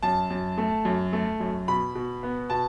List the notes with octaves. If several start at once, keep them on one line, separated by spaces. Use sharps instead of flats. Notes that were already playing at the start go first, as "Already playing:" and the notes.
F#2 A5
F#2
A3
F#2
A3
F#2
B2 B5
B2
B3
B2 A5